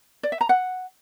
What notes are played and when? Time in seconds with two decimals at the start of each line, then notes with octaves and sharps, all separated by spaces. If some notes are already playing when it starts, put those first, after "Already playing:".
0.23 D5
0.32 E5
0.41 A#5
0.49 F#5